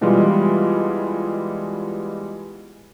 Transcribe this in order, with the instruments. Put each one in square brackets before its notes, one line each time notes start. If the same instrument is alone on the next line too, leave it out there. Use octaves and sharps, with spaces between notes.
[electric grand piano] B2 E3 G3 G#3 F4